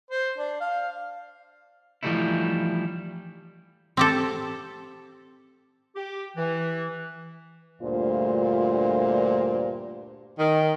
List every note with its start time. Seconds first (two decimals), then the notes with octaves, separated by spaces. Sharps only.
0.10 C5
0.38 D4
0.61 F5
2.03 E3 F3 G3 A3 D#4 E4
3.97 C4 G4 A4
5.96 G4
6.37 E3
7.81 D2 G2 A#2 A3 F4 C5
10.39 D#3